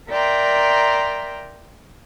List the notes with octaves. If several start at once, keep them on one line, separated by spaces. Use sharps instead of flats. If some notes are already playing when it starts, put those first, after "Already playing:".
A#4 D5 E5 G5 A#5 C6